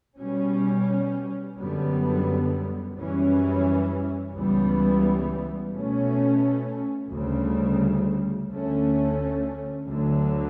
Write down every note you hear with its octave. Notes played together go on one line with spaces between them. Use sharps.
B2 G3 C#4
F#2 D3 G3 B3
F#2 E3 G3 C#4
C#2 C#3 E3 G3 B3
B2 A3 C#4
D2 C#3 G3
D2 D3 A3 C#4
D2 D3 F#3